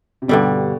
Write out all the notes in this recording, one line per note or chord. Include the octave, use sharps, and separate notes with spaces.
C3
G2 B2 D3 G3